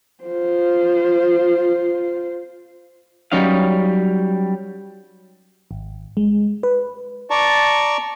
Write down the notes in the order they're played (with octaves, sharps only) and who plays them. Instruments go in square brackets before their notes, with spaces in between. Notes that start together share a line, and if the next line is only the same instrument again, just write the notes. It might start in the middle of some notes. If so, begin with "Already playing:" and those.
[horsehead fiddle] F4 C5
[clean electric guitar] F#3 G3 C#4 D#4 F5
[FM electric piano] G#1
G#3
B4
[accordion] D5 A5 A#5 C#6